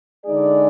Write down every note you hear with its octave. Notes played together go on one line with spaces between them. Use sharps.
D3 G#3 D#4 G#4 D5